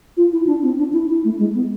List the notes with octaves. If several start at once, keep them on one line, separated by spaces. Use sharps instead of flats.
F4
E4
D4
C4
D4
E4
E4
A3
G#3
B3